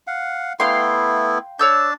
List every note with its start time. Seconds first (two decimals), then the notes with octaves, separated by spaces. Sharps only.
0.07 F5 F#5
0.60 A3 B3 E4 F5 G5 C6
1.59 D4 C#5 A5 E6 G6